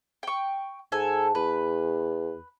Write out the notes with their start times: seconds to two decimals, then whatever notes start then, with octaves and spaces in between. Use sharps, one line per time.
0.23 G5 C#6
0.92 G#2 A4 G#5
1.35 E2 B4